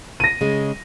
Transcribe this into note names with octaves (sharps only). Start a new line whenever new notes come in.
A#6 D#7
C#3 G#3